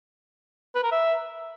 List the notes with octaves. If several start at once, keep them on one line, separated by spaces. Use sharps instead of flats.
B4
A#4
E5